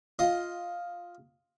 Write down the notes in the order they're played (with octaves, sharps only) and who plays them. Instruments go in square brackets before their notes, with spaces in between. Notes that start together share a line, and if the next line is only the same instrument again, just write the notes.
[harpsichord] F4 D#5